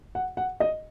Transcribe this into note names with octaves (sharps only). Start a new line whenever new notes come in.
F#5
F#5
D#5